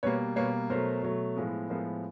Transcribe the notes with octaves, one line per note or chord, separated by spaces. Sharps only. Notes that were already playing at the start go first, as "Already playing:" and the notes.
B2 G3 A#3 B4 C#5
B2 G3 A#3 B4 C#5
B2 F#3 A3 A#4 C5
B2 F#3 A3
A2 F3 G#3 B3
A2 F3 G#3 B3 A#4 C5